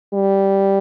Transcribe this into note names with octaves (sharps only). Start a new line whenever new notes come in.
G3